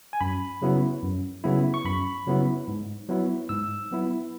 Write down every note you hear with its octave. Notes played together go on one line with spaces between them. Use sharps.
G#5
F#2 B5
C#3 F#3 B3 E4
F#2
C#3 F#3 B3 E4
C#6
F#2 B5
C#3 F#3 B3 E4
G#2
F#3 B3 E4
G#2 E6
F#3 B3 E4